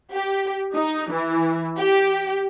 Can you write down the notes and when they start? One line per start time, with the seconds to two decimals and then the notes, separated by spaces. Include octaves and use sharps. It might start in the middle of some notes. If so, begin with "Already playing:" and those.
0.12 G4
0.74 D#4
1.11 E3
1.78 G4